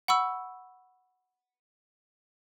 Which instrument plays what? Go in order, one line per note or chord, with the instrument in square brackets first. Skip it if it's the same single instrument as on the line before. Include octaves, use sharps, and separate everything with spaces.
[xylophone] F#5 B5 C#6 E6